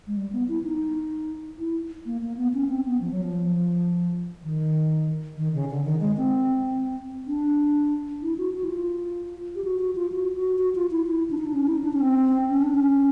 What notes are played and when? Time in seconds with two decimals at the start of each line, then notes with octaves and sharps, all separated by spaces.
0.07 G#3
0.17 G3
0.33 B3
0.48 E4
0.64 D#4
1.58 E4
2.06 A#3
2.22 A#3
2.37 B3
2.54 C#4
2.69 C4
2.85 B3
3.01 F3
3.11 F#3
3.23 F3
4.43 D#3
5.37 D#3
5.54 C#3
5.70 D3
5.85 D#3
6.01 G#3
6.17 C4
7.27 D4
8.22 E4
8.38 F#4
8.53 F#4
8.64 E4
8.69 F4
9.56 G4
9.64 F#4
9.80 F#4
9.95 F4
10.12 F#4
10.36 F#4
10.59 F#4
10.75 F4
10.91 E4
11.06 E4
11.31 D4
11.38 D#4
11.46 D4
11.54 C#4
11.67 E4
11.75 D#4
11.84 D4
11.93 C#4
12.01 C4
12.49 C#4
12.62 D4
12.74 C#4